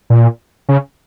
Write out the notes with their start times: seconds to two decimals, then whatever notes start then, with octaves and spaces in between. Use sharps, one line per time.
0.10 A#2
0.69 C#3